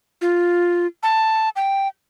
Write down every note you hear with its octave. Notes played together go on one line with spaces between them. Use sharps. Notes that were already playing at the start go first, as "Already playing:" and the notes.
F4
A5
G5